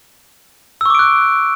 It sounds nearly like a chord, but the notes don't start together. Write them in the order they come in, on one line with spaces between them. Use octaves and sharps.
E6 C#6 D6 D7 F#6